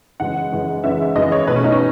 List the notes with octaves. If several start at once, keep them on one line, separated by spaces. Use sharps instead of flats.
F#2 C#3 E3 G#3 F#5
F#2 C#3 E3 G#3
F#2 C#3 E3 G#3 E5
F#2 C#3 E3 G#3 D#5
C#5
B2 A3 B4
C#4
D#4
C#4